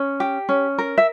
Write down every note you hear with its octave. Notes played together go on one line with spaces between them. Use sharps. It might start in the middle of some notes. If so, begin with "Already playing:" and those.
Already playing: C#4
G4
C#4
A#4
E5